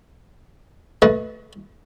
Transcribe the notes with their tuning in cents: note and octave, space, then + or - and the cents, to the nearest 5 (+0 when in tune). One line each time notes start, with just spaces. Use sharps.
A3 +0 B4 +0 D#5 +30